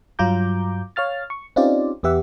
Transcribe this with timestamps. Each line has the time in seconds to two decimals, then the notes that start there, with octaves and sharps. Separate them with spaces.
0.19 G2 F#3 F4 A#5 D6 G6
0.96 C#5 F5 F6 A6
1.30 C#6
1.56 C4 C#4 D#4 F4 G4 D5
2.03 E2 B3 G4 E5 F#5